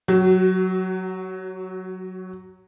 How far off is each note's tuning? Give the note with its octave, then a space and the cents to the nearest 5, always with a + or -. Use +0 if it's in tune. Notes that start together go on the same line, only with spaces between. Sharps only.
F#3 +0 F#4 +30